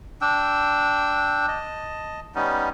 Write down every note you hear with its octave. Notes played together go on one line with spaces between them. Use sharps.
D4 G5 E6
D#5 A5
G3 B3 C#4 D#4